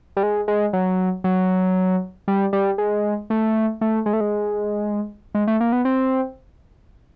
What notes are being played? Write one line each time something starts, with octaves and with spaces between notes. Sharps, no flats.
G3
G#3
G#3
F#3
F#3
G3
G3
G#3
A3
A3
G#3
A3
G#3
G#3
A3
A#3
B3
C4